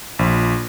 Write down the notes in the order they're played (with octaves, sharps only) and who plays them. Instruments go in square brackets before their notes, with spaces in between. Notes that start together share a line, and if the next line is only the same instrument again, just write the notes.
[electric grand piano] A#1